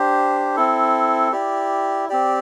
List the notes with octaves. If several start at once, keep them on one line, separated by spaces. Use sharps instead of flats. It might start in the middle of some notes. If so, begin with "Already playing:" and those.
Already playing: D4 G4 C5
C4 E4 A4
E4 G4 D5
C4 G4 D5